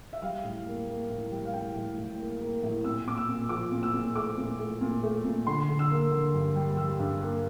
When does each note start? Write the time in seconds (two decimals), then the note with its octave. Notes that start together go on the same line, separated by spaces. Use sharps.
0.13 E5
0.22 G3 F5
0.44 A2
0.66 A#3
0.88 A#3
1.10 A2
1.32 G3
1.45 F5
1.53 A2 G5
1.75 A2
1.97 A2
2.19 A#3
2.41 A#3
2.63 A2
2.84 A#2 E6
3.06 A#2 D6
3.18 E6
3.28 A#2
3.49 F3 D6
3.72 A#2
3.83 E6
3.93 A#2
4.15 A3 D6
4.37 A#2
4.59 A3
4.81 A#2
5.03 A3
5.25 A#2
5.47 D3 C6
5.68 D3
5.79 E6
5.90 A#3
6.12 D3
6.34 G2
6.56 G3
6.77 G3 E6
6.99 G2
7.21 A#3